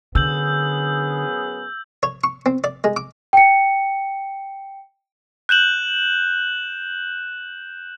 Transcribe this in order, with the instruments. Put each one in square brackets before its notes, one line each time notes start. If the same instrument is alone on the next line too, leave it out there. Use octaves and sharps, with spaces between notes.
[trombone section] F#2 B3 G#4 [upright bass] D3 [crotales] E6 G6 F#7
[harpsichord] C#5
C#6
C4
D5
G#3
D6
[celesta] G5 C#7
[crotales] F#6 G6 E7 F#7